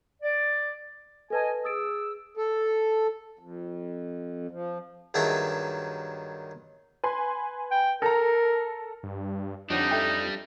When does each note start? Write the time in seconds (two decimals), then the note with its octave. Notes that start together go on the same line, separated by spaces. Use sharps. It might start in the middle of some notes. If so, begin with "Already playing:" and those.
0.22 D5
1.30 A4 B4 D#5 G#5 A5
1.65 G#4 D#6 E6 A6 D7
2.37 A4
3.39 F2
4.51 F3
5.14 G2 D#3 F#3 G#4 E5 A5
7.03 B4 G#5 C6
7.72 G5
8.02 A4 A#4 A#5
9.03 G2
9.70 F2 D3 G3 D4 D#4 C#5 F#5
9.91 A4 E5 G5